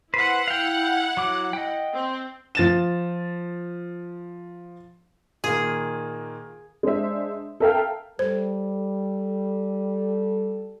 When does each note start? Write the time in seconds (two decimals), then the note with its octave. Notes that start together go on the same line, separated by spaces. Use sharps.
0.14 E4 B4 C5 F#5
0.48 F5 G5
1.17 F#3 D6
1.53 D#5 G5
1.94 C4
2.55 F3 A6 E7
5.44 A#2 D#3 A#3 G#4
6.83 G#3 D4 C5 E5
7.60 A4 A#4 E5 F5 G5 F6
8.19 G3 A4 C5